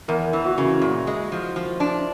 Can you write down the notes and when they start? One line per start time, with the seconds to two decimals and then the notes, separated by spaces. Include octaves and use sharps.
0.08 E2 A#4
0.33 E3
0.45 F#4
0.58 C#3
0.63 E4
0.82 A#2
1.07 G#3
1.32 F3
1.56 F3
1.80 D4